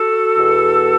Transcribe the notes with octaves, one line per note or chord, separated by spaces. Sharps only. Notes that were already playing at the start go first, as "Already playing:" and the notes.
Already playing: F#4 A4
E2 B2